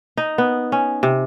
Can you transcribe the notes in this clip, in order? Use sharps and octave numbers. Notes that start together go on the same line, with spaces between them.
D#4
B3
C#4
C3